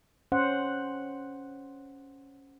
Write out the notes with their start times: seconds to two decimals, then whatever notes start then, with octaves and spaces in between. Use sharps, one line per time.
0.32 C#4 C5 F#5